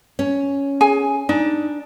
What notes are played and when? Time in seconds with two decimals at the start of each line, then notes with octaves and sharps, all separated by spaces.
0.19 C#4
0.81 G#4 G#5
1.29 D4 D#4